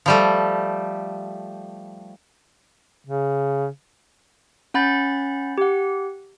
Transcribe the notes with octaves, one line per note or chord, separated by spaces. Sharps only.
F3 G3 A3
C#3
C#4 F#5 B5 G6 A6
G4 F#5